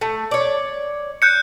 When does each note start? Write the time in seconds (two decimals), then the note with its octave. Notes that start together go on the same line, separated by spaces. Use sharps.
0.01 A3
0.31 C#5 D5
1.22 F#6 G6 C#7